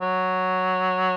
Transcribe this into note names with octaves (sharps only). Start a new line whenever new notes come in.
F#3